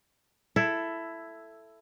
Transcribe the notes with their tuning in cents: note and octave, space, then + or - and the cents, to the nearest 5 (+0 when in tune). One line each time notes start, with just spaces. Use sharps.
E4 +10 A4 +0